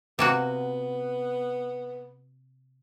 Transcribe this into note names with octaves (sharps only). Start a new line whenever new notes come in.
C3 A#3 B3 F#4